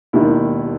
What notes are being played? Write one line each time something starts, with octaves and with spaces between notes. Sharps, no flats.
E1 D#2 D#3 E4